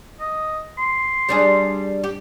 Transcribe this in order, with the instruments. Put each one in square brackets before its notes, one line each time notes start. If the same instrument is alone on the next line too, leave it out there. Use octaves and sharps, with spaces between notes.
[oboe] D#5
C6
[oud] G3 D4 G#4
G4